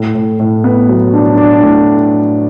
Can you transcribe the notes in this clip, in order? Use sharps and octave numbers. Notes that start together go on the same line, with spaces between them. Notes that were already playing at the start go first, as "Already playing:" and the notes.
Already playing: A2
A2
A2
B3
F#3
D4
D4
A2